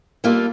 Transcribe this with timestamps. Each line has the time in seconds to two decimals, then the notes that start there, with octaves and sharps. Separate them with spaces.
0.24 G3 A#3 F4 A4